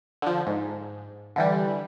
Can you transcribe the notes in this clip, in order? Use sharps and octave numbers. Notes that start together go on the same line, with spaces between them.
D3 F3
G#2
D3 E3 G3